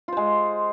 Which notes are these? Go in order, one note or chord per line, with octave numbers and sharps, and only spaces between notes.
G#3 F4 C5